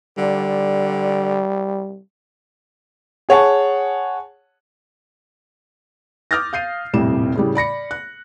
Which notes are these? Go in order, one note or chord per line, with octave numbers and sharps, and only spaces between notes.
D3 G3
G#4 C#5 F#5 A5
D6 D#6 F6 G6 A6 A#6
F5 G6 C7 D#7
D#1 F2 A2 C3 G3 E7
A2 C#3 G3
D5 B5 A#6 C#7
F#6